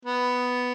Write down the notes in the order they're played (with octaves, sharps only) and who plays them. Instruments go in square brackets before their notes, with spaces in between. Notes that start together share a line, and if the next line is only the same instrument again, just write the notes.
[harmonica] B3